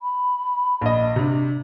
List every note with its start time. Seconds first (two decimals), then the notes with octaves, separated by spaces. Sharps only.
0.02 B5
0.81 A#1 D#5
1.16 C3 D4